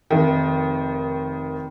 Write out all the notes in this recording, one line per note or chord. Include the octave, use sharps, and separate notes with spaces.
F1 D#3